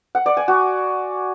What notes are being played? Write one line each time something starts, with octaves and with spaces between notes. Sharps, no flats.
F#5
D5
G#5
F#4